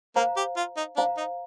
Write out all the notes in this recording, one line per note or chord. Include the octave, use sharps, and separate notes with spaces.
A#3 C5 F5 A#5
G4
F4
D#4
D4 C5 F5 A#5
D#4